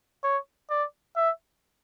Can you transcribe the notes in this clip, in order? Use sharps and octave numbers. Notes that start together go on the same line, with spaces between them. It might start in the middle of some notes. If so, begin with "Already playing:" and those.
C#5
D5
E5